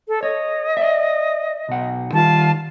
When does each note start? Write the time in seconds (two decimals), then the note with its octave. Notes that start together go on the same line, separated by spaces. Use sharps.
0.08 A4
0.23 C#5 D#5
0.77 D5 E5
1.68 B1 F#5
2.13 D#3 G3 F4 A5